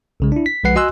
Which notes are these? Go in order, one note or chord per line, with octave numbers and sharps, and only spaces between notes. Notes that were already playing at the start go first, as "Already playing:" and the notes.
B1 C#3 G#3
D4 E4
B6
B1 F3 G#3 B4 F#5 C7
F#4 D#5 G#5 C6 E6 F#6